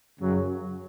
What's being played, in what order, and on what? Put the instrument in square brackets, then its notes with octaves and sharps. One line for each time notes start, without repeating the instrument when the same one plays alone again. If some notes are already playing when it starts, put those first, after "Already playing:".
[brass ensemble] F#2 C#3 F#3